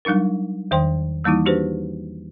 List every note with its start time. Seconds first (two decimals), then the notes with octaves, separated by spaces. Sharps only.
0.05 F#3 G3 D4 D#4 A#4
0.71 E2 D#3 C5 G5 C6
1.24 E3 G3 A#3 D#4 E4
1.46 D4 F#4 G4 B4 C5